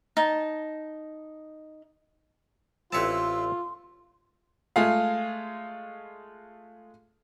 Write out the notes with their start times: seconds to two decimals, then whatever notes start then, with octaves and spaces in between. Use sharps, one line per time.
0.17 D#4 A5
2.92 A1 C4 E4 F4 B4 C#5 A5 C6
4.76 G#3 A3 F4 G#4 F5